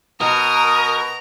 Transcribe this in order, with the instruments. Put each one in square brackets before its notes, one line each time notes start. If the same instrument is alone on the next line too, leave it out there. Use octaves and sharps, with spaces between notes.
[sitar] B2 [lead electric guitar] A#4 [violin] A#5 [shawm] D#6